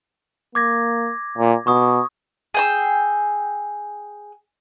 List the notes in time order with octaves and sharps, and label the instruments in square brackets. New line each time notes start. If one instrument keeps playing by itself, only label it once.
[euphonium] A#3 [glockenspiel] D6 G#6 A#6
[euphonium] A#2
[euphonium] B2 [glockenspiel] C#6 D#6
[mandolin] G#4 G5 E6